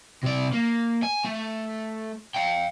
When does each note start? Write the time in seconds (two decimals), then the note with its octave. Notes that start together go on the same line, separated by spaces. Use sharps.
0.23 C3 D5
0.53 A#3
1.03 G#5
1.25 A3
2.34 F5 G5